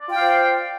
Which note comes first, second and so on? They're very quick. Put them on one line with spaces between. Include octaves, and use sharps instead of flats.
D5 F4 G5 F5 C5